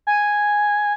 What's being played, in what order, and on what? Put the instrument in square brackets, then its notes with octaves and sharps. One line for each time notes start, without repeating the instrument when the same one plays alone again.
[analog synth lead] G#5